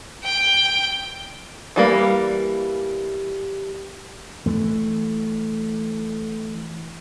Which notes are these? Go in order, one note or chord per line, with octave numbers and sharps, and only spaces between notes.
G5
E3 G3 A#3
E3 A3